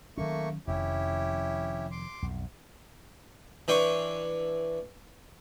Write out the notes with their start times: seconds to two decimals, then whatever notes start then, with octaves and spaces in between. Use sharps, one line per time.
0.18 D#3 F#3 A3 A#3 C#4 C#6
0.67 F1 F2 D#3 C#4 E4 G4
1.91 C6 D6
2.23 B1 F2
3.68 E3 D4 G5 C6 C#6